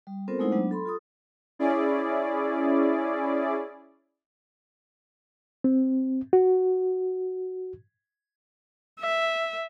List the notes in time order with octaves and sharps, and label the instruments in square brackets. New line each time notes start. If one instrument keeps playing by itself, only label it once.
[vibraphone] G3
B3 C4 F4 A4 A#4 C5
G#3 A3 D#4 E4 C5 F#5
F#3 B3 D4 F#5
A4 B5 C6
F4 A4 D#6
[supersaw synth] C#4 E4 G#4 D5
[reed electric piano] C4
F#4
[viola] E5